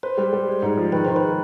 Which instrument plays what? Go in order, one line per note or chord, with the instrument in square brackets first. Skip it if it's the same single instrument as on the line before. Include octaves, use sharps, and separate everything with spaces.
[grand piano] B4 [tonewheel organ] C5
[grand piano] G3
G3
G#3
G#2
F3
[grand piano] D#3 [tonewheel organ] B4
[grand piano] D#3 [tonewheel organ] C5
[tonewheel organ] B4
[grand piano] G#3